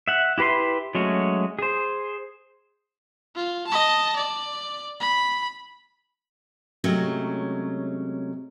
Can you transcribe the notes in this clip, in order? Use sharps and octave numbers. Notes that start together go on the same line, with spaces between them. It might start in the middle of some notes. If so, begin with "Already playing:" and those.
E5 F#5
E4 G4 B4 B5 C6
F#3 G#3 A3 C#4 F#4
G#4 C5
F4
D#5 A5
D5
B5
C3 F#3 G#3 A3 C#4